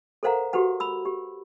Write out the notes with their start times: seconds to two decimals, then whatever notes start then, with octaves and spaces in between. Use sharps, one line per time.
0.23 A4 A#4 C5 F5 F#5 A#5
0.53 F#4 G4 A4 B4 F#5
0.80 B5 E6
1.05 G4